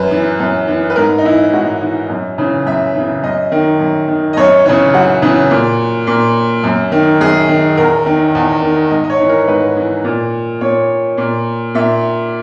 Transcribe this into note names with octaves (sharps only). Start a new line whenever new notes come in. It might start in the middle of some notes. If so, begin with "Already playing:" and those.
Already playing: F#2 B4
E3
F#2
E3
B4
G#2 A#4
D#4
E3 E4
G#2 F#4
E3
F#2
C#3 E3
F#2 E5
C#3 E3
F#2 D#5
D#3
F#2
D#3
D#5
F#2 C#5
C#3 E3 C#5
F#2 F#4
C#3 E3
A#2
A#2
F#2
D#3
F#2 G#4
D#3
E2 A#4
D#3
E2
D#3
G#2 D#5
D#5
C#5
E3
A#4
G#2 B4
E3
A#2
A#2 C#5
A#2
A#2 E5